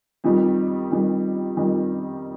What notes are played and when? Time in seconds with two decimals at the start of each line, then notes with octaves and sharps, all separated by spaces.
0.24 F2 D#3 G3
0.90 F2 D#3 G3
1.57 F2 D#3 G3